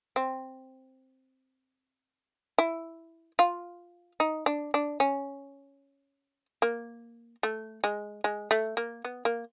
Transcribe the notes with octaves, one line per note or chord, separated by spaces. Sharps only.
C4
E4
F4
D#4
D4
D4
C#4
A#3
A3
G#3
G#3
A3
A#3
B3
A#3